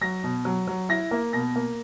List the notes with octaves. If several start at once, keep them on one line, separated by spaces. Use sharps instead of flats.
F#3 A#6
B2
F#3
F#3
E4 A#6
A#3
B2 A#6
A#3